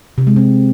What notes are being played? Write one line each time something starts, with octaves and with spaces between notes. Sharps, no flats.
C3
G#3
C4